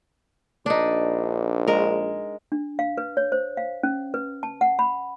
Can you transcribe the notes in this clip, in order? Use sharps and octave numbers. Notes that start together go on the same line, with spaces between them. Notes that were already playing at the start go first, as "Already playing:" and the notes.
A#1 D4 D#4
G#3 A#4
D4
F5
B4
C#5
C5
F5
C#4
B4
A5
F#5
B5